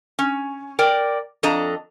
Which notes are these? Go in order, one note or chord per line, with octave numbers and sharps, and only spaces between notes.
C#4
A#4 D5 G5
F2 D4 A4 D#5 A#5